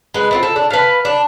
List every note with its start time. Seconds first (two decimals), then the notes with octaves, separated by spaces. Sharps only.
0.14 G#3 B4
0.31 A3 C4 F4
0.43 A4
0.56 D4
0.70 B4 F5
1.05 D4